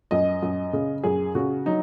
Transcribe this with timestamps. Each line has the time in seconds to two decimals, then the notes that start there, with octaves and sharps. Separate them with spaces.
0.11 F#2 D#5
0.42 F#2
0.73 C#3
1.04 F#2 G#4
1.35 C#3 F#4
1.66 F#3 D#4